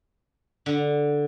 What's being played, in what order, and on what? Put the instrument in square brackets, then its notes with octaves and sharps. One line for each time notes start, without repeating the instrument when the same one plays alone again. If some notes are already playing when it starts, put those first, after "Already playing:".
[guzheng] D3